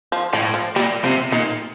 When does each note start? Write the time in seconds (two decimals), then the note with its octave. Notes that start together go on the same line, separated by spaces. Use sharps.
0.12 F3
0.33 A2 F3
0.54 F3
0.76 A#2 G3
1.04 C3 F3
1.32 A#2 D#3